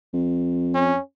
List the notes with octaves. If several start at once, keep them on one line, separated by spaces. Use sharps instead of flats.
F2
C#4